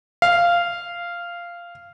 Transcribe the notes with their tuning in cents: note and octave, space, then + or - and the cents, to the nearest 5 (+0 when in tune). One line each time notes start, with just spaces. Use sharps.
F5 -10